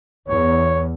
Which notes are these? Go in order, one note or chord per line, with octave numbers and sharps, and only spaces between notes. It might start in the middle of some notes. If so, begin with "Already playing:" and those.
E2 C#5